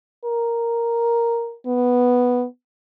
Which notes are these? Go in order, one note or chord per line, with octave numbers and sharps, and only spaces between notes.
A#4
B3